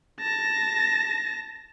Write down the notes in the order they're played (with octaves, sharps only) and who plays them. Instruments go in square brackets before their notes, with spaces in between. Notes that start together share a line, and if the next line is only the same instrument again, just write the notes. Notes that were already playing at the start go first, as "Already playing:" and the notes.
[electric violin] A5 A#6